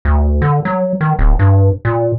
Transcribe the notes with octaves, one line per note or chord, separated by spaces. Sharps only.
D2
D3
F#3
D#3
D1
G2
A#2